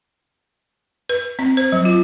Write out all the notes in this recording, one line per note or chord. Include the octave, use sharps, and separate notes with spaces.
B4
C4
C5
F#3
F4